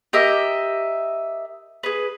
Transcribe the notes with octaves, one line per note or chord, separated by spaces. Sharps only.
G4 A#4 D#5 E5
G#4 B4